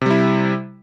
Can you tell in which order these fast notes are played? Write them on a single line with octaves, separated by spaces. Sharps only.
C3 G3 E4